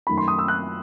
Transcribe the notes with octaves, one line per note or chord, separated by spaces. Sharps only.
F#2 D#3 A3 B5
C6
D#6
E6
F#6